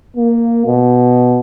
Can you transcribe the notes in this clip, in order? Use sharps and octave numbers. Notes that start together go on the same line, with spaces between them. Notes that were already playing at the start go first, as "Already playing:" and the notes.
A#3
B2